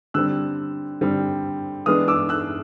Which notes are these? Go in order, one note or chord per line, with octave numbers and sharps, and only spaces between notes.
D3 G3 C4 E6 F#6
D3 G3 C4
E3 G#3 B3 D4 D#6 F6
D6 E6
E6 F#6